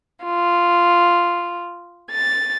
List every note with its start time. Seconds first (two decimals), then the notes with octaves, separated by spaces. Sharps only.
0.23 F4
2.11 A6